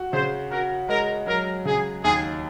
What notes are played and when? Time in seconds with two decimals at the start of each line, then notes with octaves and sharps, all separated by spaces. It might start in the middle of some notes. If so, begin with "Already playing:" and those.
Already playing: F#4
0.13 C#3 C5
0.51 F#4 A#4
0.89 G#3 A#4
1.27 F#3 A#4
1.65 C#3 G#4
2.04 D#2 G#4